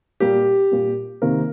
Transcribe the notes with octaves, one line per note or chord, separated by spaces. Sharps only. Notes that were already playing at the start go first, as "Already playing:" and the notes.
A#2 G3 A#3 G4
A#2 G3 A#3
C3 D#3 A#3 A#4